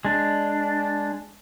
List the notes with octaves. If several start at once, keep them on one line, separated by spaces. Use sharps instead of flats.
G#3 D4